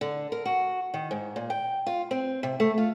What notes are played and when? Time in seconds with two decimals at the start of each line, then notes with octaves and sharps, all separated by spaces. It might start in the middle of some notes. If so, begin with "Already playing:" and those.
0.01 D3
0.32 A#4
0.45 F#4
0.94 D#3
1.11 G#2
1.36 A#2
1.50 G5
1.87 F4
2.11 C4
2.43 C3
2.60 A3
2.78 F4